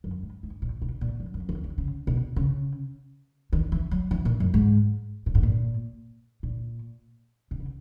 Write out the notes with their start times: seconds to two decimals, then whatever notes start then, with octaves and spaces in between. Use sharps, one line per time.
0.04 F#2
0.23 G#2
0.43 G#2
0.62 A#2
0.82 B2
1.01 A#2
1.20 F#2
1.34 F#2
1.49 E2
1.64 E2
1.78 C#3
2.07 B2
2.36 C#3
3.53 D#3
3.72 E3
3.91 F#3
4.11 E3
4.25 A#2
4.40 F#2
4.54 G#2
5.26 A#2
5.35 G#2
5.43 A#2
6.43 A#2
7.51 B2
7.59 C#3